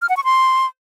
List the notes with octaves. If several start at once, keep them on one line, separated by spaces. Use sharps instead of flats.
F6
F#5
C#6
C6